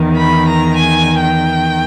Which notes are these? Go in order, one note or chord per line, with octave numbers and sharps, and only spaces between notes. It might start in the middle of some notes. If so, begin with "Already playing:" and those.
Already playing: E2 D#3
B5
A#5
G#5
G5